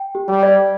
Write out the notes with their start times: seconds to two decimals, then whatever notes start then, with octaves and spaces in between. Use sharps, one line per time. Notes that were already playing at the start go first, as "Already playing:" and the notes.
Already playing: G5
0.15 G4
0.28 G3
0.43 D5